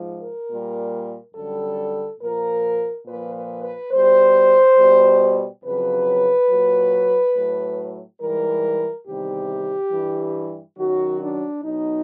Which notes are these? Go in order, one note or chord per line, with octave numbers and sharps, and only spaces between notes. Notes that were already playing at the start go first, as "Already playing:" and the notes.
Already playing: G#2 F3
A#4
A#2 G3
F#2 D3 G3 A4
A#2 F3 A#4
A#2 F3 B4
B4
B4
B2 G3 C5
B2 G3
F2 C#3 F#3 B4
A#2 F#3
A2 F#3
G#2 E3 G3 A#4
E2 C3 D#3 G3 G4
G2 E3 G3
F#2 D#3 F#3 F#4
D4
B2 F#3 D#4